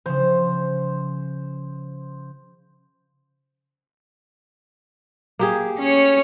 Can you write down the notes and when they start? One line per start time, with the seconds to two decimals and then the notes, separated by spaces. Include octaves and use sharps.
0.06 C#3 F3 C5
5.39 A#3 G4 G#4
5.79 C#4 C#5